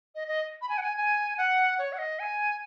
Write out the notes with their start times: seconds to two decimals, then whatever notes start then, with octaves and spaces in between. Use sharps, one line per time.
0.15 D#5
0.28 D#5
0.62 B5
0.69 G#5
0.78 F#5
0.83 G#5
0.97 G#5
1.38 F#5
1.79 C#5
1.93 F#5
1.98 D#5
2.19 G#5